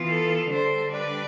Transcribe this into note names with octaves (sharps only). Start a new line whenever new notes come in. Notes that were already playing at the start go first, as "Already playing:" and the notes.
Already playing: E3 B3 F4
A4
D3 G3 D4 A4 C5
B4 D5